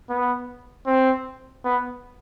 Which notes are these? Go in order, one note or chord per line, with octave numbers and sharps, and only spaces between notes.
B3
C4
B3